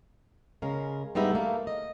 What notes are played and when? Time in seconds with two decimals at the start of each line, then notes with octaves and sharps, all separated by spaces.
0.62 C#3 G#3 A#4
1.15 G2 G3 G#3 B3 D#4 E5
1.31 A3 A#3
1.67 D#5